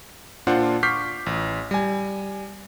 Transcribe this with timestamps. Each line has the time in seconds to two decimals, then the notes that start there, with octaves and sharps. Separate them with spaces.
0.47 A#2 D4 F4 C5 F#5 C6
0.83 C#6 D6 F6 G6 B6 C7
1.26 A1
1.71 G3 G#5